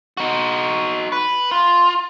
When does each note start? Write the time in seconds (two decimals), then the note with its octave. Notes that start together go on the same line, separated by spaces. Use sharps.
0.17 D#4 F#4
1.12 B4
1.51 F4